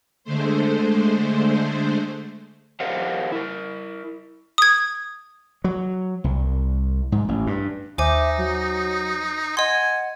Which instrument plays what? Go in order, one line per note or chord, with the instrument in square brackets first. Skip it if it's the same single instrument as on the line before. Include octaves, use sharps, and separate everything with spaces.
[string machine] D3 G#3 A3 C5
[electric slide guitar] G4 A#4 C5 D#5 F5 F#5
E4 A#4
[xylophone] D#6 G#6
[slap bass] F#3
C2
G#2
A1
G2
[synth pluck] D#2 [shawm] D#4 [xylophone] C5 G#5 D6 [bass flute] E5
[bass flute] F#3
[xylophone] D#5 C6 [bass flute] F#5 [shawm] G#5